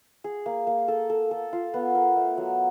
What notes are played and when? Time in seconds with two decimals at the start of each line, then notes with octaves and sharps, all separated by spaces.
0.24 G#4
0.46 A#3
0.67 A#3
0.88 A4
1.10 A4
1.31 A4
1.53 F4
1.74 B3
1.95 A#4
2.16 A3
2.38 F#3